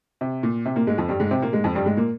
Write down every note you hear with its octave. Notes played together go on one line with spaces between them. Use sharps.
C3
A#2
C3
A#2 A#3
G#2 G#3
F2 F3
G2 G3
G#2 G#3
C3 C4
A#2 A#3
G#2 G#3
F2 F3
G2 G3
G#2 G#3
A#2 A#3